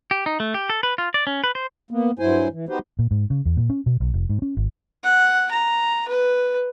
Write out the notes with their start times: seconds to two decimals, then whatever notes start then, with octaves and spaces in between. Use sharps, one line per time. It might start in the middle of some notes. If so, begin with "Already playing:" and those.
0.11 G4
0.26 D#4
0.40 A3
0.54 G4
0.70 A4
0.83 B4
0.98 F4
1.14 D5
1.27 C#4
1.44 B4
1.55 C5
1.91 A#3 B3
2.19 G2 F#3 E4 C5 G#5
2.52 E3
2.69 B3 D#4 F#4 G4 B4 C5
2.99 A#2
3.11 G#2
3.30 C#3
3.45 E2
3.57 A#2
3.70 C#4
3.86 B2
4.00 B1
4.14 F1
4.29 G#2
4.42 C#4
4.57 G#1
5.04 F#5
5.51 A#5
6.08 B4